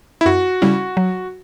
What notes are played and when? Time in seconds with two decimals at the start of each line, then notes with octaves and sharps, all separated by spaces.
0.21 E4
0.26 F#2 F#4
0.62 C#3 G3 C#4 E4
0.97 F#3